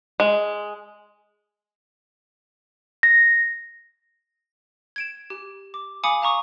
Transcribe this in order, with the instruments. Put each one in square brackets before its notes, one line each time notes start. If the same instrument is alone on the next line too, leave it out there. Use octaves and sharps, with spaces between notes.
[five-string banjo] G#3
[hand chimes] A#6
[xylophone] G#6 D7 E7
G4
D6
F5 G#5 B5 D6 D#6 C#7
F5 A#5 C#6 D#6